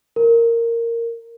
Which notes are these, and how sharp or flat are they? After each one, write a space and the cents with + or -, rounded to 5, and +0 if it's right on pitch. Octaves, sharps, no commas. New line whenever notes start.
A#4 -10